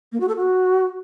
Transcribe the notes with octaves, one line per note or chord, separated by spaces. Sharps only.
A#3
F#4
A4
F#4